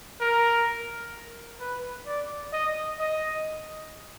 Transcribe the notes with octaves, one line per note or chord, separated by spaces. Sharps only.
A#4
B4
D5
D#5
D#5